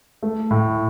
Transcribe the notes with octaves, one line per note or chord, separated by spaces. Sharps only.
A3
A2